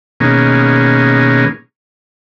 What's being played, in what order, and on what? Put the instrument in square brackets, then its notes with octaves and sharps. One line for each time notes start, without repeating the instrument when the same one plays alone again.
[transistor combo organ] B2 D#3 A#3 C#4 G#4